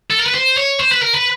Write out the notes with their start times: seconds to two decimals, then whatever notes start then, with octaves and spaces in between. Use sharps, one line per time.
0.11 A4
0.19 A#4
0.26 B4
0.35 C5
0.58 C#5
0.80 C5
0.92 B4
1.02 A#4
1.15 B4